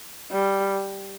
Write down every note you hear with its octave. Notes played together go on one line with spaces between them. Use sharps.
G3